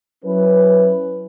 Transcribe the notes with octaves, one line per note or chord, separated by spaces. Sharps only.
F#3 C#4 E4 B4